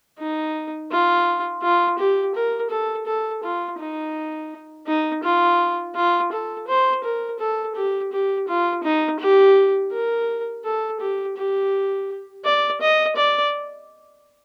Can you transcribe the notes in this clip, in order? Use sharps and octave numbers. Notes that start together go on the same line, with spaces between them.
D#4
F4
F4
G4
A#4
A4
A4
F4
D#4
D#4
F4
F4
A4
C5
A#4
A4
G4
G4
F4
D#4
G4
A#4
A4
G4
G4
D5
D#5
D5